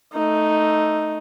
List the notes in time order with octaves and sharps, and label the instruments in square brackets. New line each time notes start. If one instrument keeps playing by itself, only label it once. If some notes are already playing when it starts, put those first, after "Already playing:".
[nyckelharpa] A3 D#4